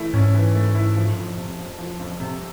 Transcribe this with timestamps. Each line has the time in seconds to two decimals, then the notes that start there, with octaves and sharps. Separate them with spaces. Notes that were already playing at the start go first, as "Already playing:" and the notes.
Already playing: E3 A3 E4
0.14 G#2 C#4
0.34 E3
0.55 A3
0.75 E4
0.96 F3
1.17 F2
1.37 C3
1.58 F2
1.79 F3
1.99 F2
2.20 C3